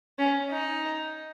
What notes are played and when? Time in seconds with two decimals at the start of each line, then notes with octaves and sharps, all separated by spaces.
0.19 C#4
0.50 D#4